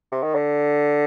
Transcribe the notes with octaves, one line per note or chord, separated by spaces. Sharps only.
C3
D#3
D3